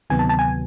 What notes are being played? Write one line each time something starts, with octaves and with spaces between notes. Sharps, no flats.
D2 C3 D#3 F#3 B3 G#5
A5
A5
G#5